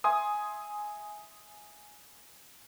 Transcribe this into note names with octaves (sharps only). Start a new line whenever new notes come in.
E5 G#5 C6 D#6